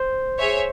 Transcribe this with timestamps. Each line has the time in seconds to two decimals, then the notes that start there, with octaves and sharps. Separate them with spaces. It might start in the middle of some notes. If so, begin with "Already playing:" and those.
Already playing: C5
0.39 G#4 C#5 E5